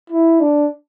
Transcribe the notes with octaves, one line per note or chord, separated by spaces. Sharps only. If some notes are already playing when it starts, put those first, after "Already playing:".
E4
D4